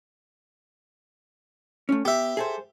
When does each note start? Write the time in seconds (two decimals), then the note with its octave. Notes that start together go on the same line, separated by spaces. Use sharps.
1.89 A3 C#4
2.05 B3 G4 E5
2.37 G#4 A4 C5